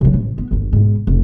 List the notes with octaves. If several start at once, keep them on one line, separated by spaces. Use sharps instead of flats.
C3 F#3
A1
B3
G1 D#2
G#2 B2
F1 C2